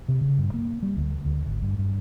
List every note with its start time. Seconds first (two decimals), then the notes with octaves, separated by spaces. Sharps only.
0.08 C3
0.21 C#3
0.38 G2
0.54 A#3
0.83 G3
0.96 D2
1.25 D2
1.46 G#1
1.62 G2
1.78 G2